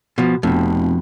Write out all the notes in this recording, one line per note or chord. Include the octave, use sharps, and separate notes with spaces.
B2 F3
F1 F2 B2